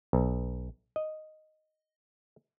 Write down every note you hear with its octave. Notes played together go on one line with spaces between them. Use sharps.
B1
D#5